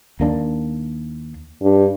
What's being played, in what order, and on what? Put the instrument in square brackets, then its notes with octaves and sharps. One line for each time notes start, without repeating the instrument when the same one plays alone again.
[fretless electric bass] D#2 A#3 D4
[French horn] G2